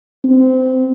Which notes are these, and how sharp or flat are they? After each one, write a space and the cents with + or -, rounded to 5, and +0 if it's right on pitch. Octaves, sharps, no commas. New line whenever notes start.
C4 -20